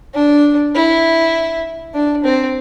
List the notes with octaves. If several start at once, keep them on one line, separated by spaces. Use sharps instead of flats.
D4
E4
D4
C4